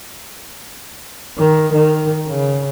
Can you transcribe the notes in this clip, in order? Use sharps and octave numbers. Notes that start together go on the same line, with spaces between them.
D#3
D#3
C#3